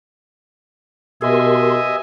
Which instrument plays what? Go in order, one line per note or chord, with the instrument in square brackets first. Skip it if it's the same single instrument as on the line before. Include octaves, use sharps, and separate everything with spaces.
[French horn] B2 [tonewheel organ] G4 A#4 C6 [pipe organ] D#5 E5 G#5